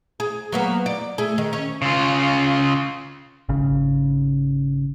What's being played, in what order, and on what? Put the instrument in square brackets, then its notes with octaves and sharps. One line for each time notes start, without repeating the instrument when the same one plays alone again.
[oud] G#4
F#3 A#3 B3
D5
A3 G#4
D#3
C#4
[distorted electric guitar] C#3 F4
[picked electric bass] G#1 C#3